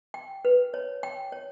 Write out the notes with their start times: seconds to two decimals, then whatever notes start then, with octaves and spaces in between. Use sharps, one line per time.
0.14 G5
0.45 B4
0.74 C#5
1.03 G5
1.32 C#5